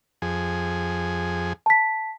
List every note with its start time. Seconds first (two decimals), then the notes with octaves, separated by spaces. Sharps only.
0.22 F2 G#4
1.66 A5 B6